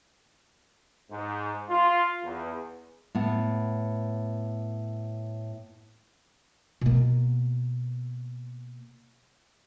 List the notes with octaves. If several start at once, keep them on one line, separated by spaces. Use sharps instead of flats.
G#2
F4
E2
A2 B3
B2 A#3